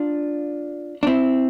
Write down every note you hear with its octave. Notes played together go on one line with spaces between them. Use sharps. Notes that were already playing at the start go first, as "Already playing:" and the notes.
Already playing: D4 F4
D4
C4 E4